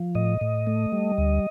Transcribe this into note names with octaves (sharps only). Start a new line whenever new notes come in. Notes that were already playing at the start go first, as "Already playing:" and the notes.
Already playing: F3
A2 D#5
A2
A3
G3
D2